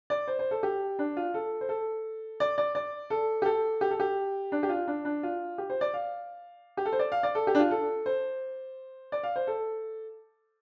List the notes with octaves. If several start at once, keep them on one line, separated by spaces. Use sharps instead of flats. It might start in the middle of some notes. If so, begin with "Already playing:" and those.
D5
C5
C5
A4
G4
D4
F4
A4
C5
A4
D5
D5
D5
A4
G4
A4
G4
A4
G4
D4
G4
F4
D4
D4
F4
G4
C5
D5
F5
G4
A4
C5
D5
F5
D5
A4
G4
D4
F4
A4
C5
D5
F5
C5
A4